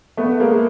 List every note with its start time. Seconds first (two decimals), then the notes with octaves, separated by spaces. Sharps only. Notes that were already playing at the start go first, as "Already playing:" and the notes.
0.17 A3 B3
0.40 G#3 A#3